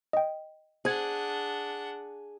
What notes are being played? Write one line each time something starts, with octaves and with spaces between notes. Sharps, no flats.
D#5 G5
D4 G#4 C5 F#5 G#6